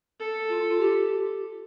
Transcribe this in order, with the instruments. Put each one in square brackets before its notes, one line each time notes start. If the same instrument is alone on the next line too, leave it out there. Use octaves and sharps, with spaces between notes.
[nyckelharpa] A4
[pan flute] F4
F4
G4